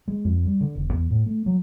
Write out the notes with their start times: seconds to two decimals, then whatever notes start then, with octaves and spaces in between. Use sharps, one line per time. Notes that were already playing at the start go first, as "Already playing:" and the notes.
0.08 G#3
0.25 F2
0.45 G3
0.61 D3
0.75 E1
0.93 E2
1.10 A2
1.26 A3
1.46 F#3